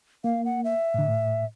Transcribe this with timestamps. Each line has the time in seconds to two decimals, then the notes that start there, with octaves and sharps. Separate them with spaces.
0.24 A#3 F5
0.45 F#5
0.64 E5
0.94 A2 D3
1.08 A2